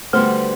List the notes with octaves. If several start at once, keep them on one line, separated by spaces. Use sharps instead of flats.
D3 G3 A3 B3 F#4 C5